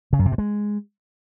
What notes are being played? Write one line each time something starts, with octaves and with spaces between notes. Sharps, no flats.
C#3
F#2
C3
G2
G#3